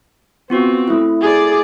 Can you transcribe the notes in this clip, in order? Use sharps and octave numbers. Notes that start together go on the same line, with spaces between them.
B3 C4 F4 F#4
A3 E4
G#4 D5